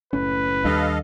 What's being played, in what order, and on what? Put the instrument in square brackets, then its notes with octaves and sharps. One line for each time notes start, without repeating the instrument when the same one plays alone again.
[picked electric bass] F#1 A2 C#4 [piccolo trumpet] B4
[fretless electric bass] D#2 G3 D4 [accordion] A4 D#5 F5